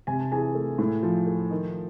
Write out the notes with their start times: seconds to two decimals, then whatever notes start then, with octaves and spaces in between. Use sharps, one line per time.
0.07 C3 G#5
0.20 A5
0.32 E3 G#4 G#5
0.55 A3
0.78 A2
1.03 F3
1.27 A3
1.51 D#3